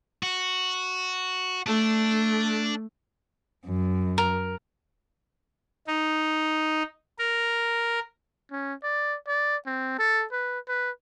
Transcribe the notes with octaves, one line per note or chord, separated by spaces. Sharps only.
F#4
A3 D4
F#2
A#4
D#4
A#4
C#4
D5
D5
C4
A4
B4
B4